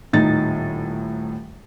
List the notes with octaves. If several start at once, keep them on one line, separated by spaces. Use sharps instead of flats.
D#1 A2 D#4 A6